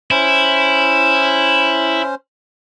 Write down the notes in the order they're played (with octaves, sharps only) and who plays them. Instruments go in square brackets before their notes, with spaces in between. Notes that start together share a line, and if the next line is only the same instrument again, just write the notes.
[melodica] C#4 C5 [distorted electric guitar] E4